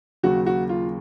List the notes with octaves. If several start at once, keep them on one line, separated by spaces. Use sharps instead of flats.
D#2 C#3 F#3 F#4
F#4
F4